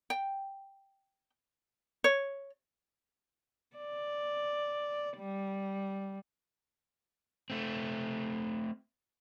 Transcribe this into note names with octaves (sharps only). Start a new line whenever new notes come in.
G5
C#5
D5
G3
A3 C4